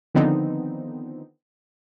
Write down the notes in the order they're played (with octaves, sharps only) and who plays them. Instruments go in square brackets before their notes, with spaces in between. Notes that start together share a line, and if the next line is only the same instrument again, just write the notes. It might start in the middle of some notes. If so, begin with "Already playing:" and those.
[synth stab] D3 D#3 F3 B3 C4 D#4